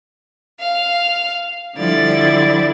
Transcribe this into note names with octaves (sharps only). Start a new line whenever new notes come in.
F5
D3 F3 G3 E4 D5 A6